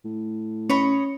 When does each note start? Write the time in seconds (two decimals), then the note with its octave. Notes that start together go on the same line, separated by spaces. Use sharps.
0.05 A2
0.69 C#4 C#5 D#5 B5